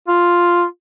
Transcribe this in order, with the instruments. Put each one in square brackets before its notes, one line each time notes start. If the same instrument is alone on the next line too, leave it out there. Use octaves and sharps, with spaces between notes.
[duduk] F4